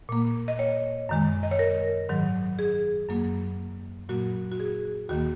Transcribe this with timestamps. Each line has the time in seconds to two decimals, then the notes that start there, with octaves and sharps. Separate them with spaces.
0.09 A#2 A#3
0.48 D#5
0.59 C#5
1.09 F#2 D#3 G#3
1.43 D#5
1.51 C#5
1.59 A#4
2.09 G#2 D#3 F#3
2.59 G#4
3.09 F#2 F#3 A#3
4.09 A#2 F#3 A#3 F#4
4.52 F#4
4.60 G#4
5.09 D#2 D#3 A#3 F#4